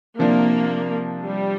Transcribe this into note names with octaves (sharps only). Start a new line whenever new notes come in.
C3 F3 A#3 D4
G3